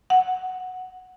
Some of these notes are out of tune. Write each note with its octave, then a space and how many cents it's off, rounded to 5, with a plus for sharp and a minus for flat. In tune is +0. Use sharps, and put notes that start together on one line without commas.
F#5 -5